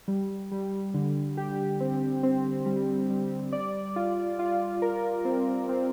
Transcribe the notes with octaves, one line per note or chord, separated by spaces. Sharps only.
G3
G3
D3
G4
C4
C4
G3
G3
D5
F4
F4
A#4
C4
C4